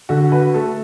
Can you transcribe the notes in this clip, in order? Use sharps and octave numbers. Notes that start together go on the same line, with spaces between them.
D3 F#4
F#4 B4
A3 A4